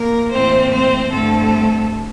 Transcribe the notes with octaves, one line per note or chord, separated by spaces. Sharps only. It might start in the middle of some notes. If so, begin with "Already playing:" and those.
Already playing: A#3 A#4
A2 E3 A#3 C4 C5
C4 C5
G2 D3 G3 A3 C4 A4